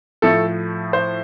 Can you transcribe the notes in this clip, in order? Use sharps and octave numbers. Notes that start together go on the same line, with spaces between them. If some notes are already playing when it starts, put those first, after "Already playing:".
A2 F3 A3 A4
C5